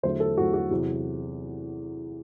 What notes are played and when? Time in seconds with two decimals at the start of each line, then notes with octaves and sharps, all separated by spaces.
0.03 E2 D3 F#3 A3 C5
0.20 A4
0.37 E2 D3 F#3 A3 F#4
0.54 F#4
0.71 E2 C3 F#3